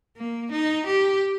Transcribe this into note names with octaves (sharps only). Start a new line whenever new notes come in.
A#3
D#4
G4